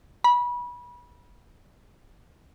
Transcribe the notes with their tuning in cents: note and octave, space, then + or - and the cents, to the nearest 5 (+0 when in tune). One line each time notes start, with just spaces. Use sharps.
B5 -25